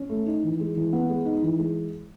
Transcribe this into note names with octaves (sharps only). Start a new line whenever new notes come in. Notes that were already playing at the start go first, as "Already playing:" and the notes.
Already playing: C#4
A3
D#4
E3
G#3
E3
B3
G#3
D#4
E3
G#3